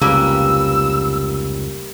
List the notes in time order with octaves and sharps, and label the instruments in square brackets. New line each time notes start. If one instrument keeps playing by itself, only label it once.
[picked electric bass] F1 C#2 C#3 [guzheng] G3 A#3 B4 [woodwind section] E6